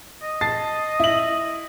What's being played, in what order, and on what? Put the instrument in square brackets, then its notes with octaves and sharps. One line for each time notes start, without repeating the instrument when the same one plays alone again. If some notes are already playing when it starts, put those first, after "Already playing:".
[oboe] D#5
[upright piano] A5 A6 C7
E4 F#7